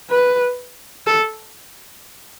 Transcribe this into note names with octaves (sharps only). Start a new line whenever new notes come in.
B4
A4